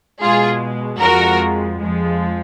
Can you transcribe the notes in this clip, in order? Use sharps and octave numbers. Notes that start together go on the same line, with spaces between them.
B2 G#3 F4 G#4
F2 F3 G#3 F#4 A#4
F2 F3 G#3